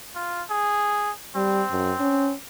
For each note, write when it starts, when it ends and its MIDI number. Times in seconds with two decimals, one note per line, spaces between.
0.15 0.43 65
0.50 1.11 68
1.36 1.63 55
1.36 2.32 60
1.71 1.92 42
2.00 2.33 61